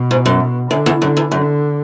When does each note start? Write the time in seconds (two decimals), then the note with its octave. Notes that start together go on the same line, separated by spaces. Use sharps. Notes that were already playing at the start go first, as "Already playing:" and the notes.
Already playing: B2
0.11 G#2
0.26 F#2
0.71 F#2 D3
0.86 E2
1.01 F#2 D3
1.17 E2
1.31 F#2 D3